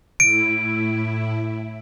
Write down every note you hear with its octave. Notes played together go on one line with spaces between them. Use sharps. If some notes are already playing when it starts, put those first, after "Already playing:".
A2 E4 D7